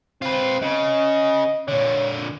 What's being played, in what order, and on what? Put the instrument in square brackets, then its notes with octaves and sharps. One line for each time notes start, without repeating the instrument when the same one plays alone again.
[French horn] C4 [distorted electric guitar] F4 B4
[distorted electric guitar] C#3 [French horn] D#5
[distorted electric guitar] A#2 D3 [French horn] C#5